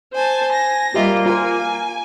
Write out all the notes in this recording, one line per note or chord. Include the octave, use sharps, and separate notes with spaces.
C5 G#5 A5
G#5 A#6
G3 A#3 F4 G4 D#5 E5
F4 A#4 G#5